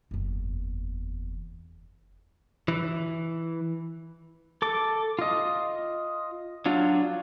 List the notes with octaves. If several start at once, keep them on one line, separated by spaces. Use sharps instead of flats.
F#1 E2
E3
A4 D6
F4 D#5
F#3 D4 F4 F#4